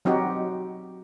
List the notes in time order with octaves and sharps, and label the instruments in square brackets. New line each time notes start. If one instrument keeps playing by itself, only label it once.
[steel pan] F#3 C4 D#4 F#4 G4